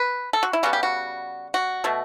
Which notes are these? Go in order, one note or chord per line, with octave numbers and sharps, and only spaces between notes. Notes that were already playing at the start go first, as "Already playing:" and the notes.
Already playing: B4
A4
F#4
E4
C#3 G3 B3 F#4
G4
F#4
F#4
B2 A3